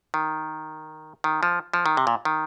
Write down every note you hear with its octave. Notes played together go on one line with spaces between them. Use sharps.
D#3
D#3
F3
F3
D#3
C3
A#2
D#3